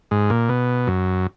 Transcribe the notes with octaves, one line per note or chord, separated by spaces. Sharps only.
G#2
A#2
B2
F#2